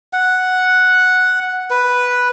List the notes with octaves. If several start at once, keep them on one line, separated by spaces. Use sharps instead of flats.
F#5
B4